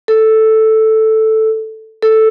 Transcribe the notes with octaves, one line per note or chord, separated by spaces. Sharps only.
A4
A4